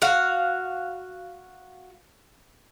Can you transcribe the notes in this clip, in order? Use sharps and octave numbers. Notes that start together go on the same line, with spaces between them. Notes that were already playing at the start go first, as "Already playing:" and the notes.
F#4 F5